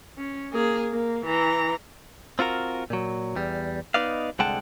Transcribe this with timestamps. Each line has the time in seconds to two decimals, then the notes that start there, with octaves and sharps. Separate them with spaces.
0.17 C#4
0.53 A#3 G#4
0.90 A#3
1.26 E3 A#5
2.39 C4 F4 F#4 A#4
2.90 A#2 F#3
3.36 E2 G3
3.94 B3 D#4 B4 D5 D#5 F5
4.39 C2 D3 G#3 F#5 G5 A5